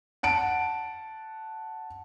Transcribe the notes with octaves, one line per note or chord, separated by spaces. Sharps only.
F#5 A5 D7